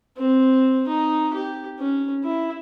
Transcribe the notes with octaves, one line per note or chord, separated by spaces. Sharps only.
C4
D#4
G4
C#4
E4